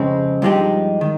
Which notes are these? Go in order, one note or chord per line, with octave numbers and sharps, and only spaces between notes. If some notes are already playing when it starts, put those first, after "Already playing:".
Already playing: F2 C#3 G#3 C4
G2 F3 G#3 D#4 G4
D#3